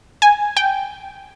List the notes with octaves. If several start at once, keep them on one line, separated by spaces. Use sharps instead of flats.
G#5
G5